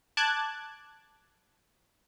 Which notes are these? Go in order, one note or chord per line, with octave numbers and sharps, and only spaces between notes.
A5 D6 F#6 G#6